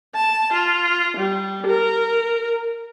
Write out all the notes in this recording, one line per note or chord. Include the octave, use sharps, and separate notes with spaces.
A5
F4
G3
A#4